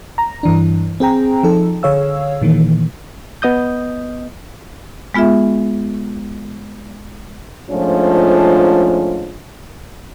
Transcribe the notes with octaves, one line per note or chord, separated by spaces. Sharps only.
A#5
G2 E3 D4
C4 G#4 G5 A#5
F3 D#4 A4
D3 G#4 C#5 F5 E6
A#2 D#3 E3 A#3
B3 D#5 D#6 G6
G#3 B3 F4 G#4 E5
G#2 F3 A3 C#4 D4 F4